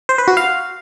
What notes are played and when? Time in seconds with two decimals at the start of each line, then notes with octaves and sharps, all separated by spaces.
0.09 C5
0.18 B4
0.28 F#4
0.37 F5